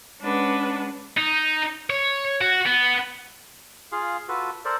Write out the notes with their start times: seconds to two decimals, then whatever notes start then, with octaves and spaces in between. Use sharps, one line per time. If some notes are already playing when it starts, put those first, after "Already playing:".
0.21 G#3 C#4 D4 B4 F#5
1.17 D#4
1.90 C#5
2.41 F#4
2.66 B3
3.92 F4 G#4 F5
4.28 F4 F#4 A4 B4
4.65 A4 A#4 C5 D5